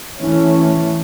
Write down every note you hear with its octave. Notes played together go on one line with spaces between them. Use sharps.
E3 A3 C#4